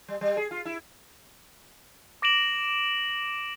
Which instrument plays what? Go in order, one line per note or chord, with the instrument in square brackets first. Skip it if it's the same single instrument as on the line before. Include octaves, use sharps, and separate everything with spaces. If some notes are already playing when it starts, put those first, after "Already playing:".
[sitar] G3
G3
G#4
F4
E4
[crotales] D6 A#6 D7 E7 F#7